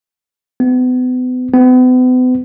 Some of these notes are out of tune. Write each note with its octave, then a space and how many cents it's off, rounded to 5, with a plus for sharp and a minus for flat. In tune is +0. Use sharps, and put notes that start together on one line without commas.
B3 +35
B3 +40